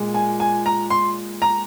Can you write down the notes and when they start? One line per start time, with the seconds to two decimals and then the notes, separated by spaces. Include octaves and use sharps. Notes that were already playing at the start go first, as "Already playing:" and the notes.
Already playing: A#2 G#3
0.14 G#5
0.40 G#5
0.66 A#5
0.90 C6
1.42 A#5